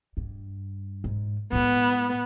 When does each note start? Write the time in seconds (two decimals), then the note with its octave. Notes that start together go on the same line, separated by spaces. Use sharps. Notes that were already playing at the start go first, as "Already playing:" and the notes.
0.17 G2
1.04 G#2
1.52 A2 G#3 B3